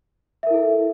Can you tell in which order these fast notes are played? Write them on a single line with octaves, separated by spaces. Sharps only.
E5 A#4 E4 A4